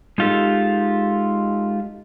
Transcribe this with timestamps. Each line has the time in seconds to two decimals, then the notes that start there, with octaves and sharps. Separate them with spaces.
0.18 G#3 D#4 F4 G4 A4